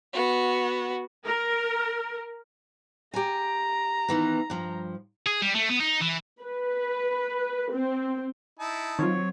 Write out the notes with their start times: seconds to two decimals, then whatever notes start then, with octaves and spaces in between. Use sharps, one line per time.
0.13 B3 F#4
1.25 A#4
3.14 G4 G#5 A#5
4.08 D#3 E3 B3
4.50 G2 F3
5.26 G#4
5.42 G3
5.55 A3
5.69 B3
5.80 D#4
6.01 E3
6.42 B4
7.72 C4
8.60 D#4 E4 A5
8.99 D#3 F#3 C4 F4 C#5